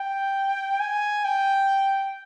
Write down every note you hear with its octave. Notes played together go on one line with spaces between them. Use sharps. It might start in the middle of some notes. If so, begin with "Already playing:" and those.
Already playing: G5
G#5
G5